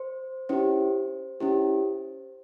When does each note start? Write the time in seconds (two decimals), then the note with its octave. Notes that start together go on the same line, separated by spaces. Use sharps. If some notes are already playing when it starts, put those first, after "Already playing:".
Already playing: C5
0.49 C#4 E4 G4 C5
1.40 C#4 E4 G4